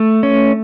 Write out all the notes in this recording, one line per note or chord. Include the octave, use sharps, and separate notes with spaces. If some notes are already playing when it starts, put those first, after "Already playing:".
Already playing: A3
C#4